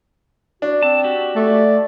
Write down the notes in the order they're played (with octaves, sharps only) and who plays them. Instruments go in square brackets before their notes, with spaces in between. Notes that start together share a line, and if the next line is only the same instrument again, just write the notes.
[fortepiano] D4 [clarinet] F#4
[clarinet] C4 [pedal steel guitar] A5
[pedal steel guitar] F#4 G4
[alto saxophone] A3 [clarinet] D5